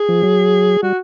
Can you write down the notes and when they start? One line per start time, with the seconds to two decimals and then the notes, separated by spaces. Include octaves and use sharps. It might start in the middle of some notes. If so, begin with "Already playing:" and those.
Already playing: G#4
0.09 F3
0.23 F#3
0.83 G3 F#4